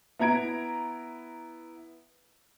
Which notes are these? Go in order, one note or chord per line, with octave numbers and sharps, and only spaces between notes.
B3 E4 A#5 G#6 D7